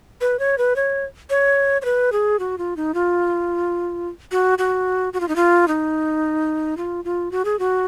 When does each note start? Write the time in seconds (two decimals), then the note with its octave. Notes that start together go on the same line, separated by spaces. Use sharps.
0.21 B4
0.39 C#5
0.58 B4
0.76 C#5
1.30 C#5
1.82 C#5
1.85 B4
2.12 G#4
2.39 F#4
2.58 F4
2.76 D#4
2.94 F4
4.31 F#4
4.58 F#4
5.13 F#4
5.20 F4
5.28 D#4
5.36 F4
5.68 D#4
6.77 F4
7.05 F4
7.31 F#4
7.45 G#4
7.59 F#4